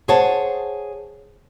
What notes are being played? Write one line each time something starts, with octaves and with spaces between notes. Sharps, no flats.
G#4 C5 C#5 F#5 A5